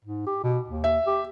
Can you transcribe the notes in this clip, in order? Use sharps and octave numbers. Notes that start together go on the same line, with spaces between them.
G#2
G4
B2
D#2
E5
G4